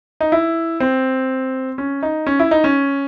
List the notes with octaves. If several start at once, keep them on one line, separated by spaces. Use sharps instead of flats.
D#4
E4
C4
C#4
D#4
C#4
E4
D#4
C#4